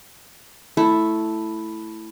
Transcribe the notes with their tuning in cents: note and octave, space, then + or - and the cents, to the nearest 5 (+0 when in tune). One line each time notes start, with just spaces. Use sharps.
A3 +0 E4 +0